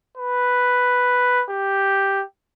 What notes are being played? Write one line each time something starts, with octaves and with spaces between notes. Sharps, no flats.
B4
G4